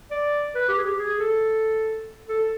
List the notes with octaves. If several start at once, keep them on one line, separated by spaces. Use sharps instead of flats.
D5
B4
G4
G#4
G4
G#4
A4
A4